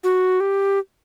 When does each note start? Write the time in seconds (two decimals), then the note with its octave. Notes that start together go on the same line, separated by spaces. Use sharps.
0.04 F#4
0.40 G4